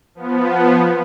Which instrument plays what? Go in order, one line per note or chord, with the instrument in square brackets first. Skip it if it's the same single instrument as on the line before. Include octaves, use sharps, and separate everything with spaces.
[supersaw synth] F3 B3